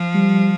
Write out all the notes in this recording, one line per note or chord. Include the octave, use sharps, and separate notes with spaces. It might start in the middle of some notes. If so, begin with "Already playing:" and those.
Already playing: F3
G3